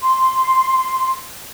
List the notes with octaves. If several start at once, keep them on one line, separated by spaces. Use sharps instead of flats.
C6